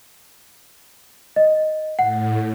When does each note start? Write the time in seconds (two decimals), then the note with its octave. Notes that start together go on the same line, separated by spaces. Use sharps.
1.36 D#5
1.99 A2 F#5